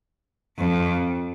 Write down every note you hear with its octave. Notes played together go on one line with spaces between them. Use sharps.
F2